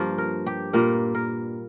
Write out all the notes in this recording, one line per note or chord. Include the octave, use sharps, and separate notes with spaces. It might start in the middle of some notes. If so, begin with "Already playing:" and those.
Already playing: G2 F3 A#3
A#4
G4
A#2 G3 A#3 A#4
A#4